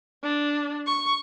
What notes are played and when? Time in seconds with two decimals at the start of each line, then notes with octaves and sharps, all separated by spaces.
0.23 D4
0.86 C#6